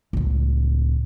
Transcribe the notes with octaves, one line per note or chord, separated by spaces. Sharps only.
C#2 A2